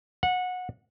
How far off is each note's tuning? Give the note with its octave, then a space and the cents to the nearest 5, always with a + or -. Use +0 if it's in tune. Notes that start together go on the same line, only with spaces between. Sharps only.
F#5 -20